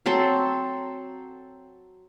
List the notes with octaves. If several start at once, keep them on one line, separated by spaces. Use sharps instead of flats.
F#3 C4 A4 C5